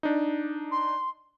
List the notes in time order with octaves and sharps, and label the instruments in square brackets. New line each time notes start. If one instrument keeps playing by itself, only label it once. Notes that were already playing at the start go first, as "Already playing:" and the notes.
[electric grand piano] D4 D#4
[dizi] C6